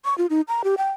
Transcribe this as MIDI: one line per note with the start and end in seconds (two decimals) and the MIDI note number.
0.05 0.16 85
0.18 0.26 65
0.30 0.41 63
0.48 0.62 82
0.64 0.75 67
0.78 0.91 79